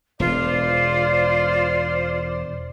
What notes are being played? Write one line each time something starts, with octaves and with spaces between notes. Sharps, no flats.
E1 F4 C5 D5